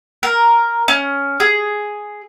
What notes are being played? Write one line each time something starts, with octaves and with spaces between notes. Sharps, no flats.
A#4
C#4
G#4